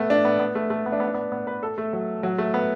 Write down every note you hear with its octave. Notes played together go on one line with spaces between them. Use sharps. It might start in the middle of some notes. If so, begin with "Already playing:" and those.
Already playing: A3 B3
D4
B3
B3
A3
A3
B3
D4
B3
D4
B3
B3
B4
A4
A3
F#3
F#3
A3
B3